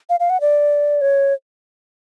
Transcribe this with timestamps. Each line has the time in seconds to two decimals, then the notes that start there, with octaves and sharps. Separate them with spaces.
0.10 F5
0.20 F5
0.30 F#5
0.41 D5
1.01 C#5